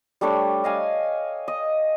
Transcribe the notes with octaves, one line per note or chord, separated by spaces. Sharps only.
G3 A3 D4 C#5
D#5 F5 G#5
D#5